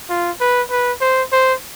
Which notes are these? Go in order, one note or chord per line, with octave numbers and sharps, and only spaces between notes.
F4
B4
B4
C5
C5